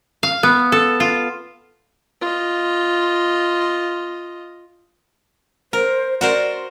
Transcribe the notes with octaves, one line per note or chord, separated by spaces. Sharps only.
F5
B3
A4
F4
F4 D#5
A#4 C5
F#4 A#4 C5 D5